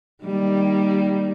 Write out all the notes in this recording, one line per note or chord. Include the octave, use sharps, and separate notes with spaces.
D#3 G3 A#3